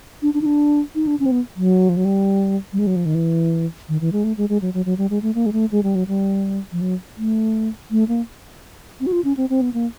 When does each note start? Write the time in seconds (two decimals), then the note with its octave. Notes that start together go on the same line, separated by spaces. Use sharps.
0.22 D4
0.34 D4
0.41 D#4
0.46 D4
0.95 D#4
1.07 D4
1.20 C#4
1.26 C4
1.31 B3
1.56 F#3
1.89 F3
1.97 F#3
2.05 G3
2.73 G3
2.79 G#3
2.87 F#3
2.96 F3
3.06 D#3
3.15 E3
3.89 D#3
4.01 E3
4.12 G#3
4.24 A3
4.37 G#3
4.49 G#3
4.62 F#3
4.74 F#3
4.86 F#3
4.98 G3
5.10 G#3
5.22 A3
5.35 A#3
5.46 G#3
5.53 A3
5.72 G#3
5.83 G3
5.95 F#3
6.07 G3
6.72 F3
6.81 F#3
7.17 A3
7.91 A3
8.08 A#3
9.00 C4
9.07 F#4
9.12 F4
9.24 C#4
9.37 C4
9.50 C4
9.61 B3
9.74 A#3